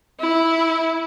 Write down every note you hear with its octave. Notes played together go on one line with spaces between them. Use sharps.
E4